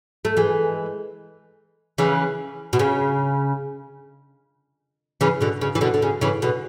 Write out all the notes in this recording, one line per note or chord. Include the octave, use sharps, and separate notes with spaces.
A3
E3 G#3
C#3 E3
B2
C#3
C#3 E3
B2 D3
C#3
E3
B2 D3
D3
C#3
C#3 E3
B2 D3